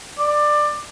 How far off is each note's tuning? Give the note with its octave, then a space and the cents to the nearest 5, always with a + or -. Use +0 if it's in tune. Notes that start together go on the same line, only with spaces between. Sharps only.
D5 +20